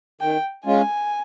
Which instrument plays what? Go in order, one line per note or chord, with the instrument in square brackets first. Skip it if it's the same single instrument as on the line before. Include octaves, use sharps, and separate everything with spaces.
[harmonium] D#3 [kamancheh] G5
[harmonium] G#3 C#4 F4 [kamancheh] G#5